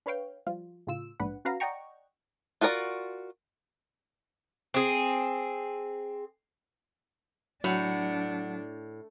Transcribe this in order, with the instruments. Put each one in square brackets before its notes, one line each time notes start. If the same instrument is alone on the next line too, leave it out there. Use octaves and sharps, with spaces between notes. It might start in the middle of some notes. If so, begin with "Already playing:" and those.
[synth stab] D4 B4 C#5 F5 G5
F3 G3 F4
A2 C#3 F4 E6 E7
A#1 G#2 D4 B4 F#5
C#4 F#4 B4 F5 A#5
D5 D#5 F#5 G5 A#5 C#6
[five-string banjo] F4 F#4 A#4 C#5 D5
[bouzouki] C4 G#4
[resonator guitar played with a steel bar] A2 [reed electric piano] F#3 [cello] D4 [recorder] F#5